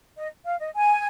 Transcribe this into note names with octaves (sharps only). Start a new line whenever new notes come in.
D#5
F5
D#5
G#5